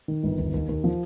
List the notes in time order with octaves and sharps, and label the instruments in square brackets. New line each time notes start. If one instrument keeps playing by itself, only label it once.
[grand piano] D#3
G1
D#2
D#2
D#2
F3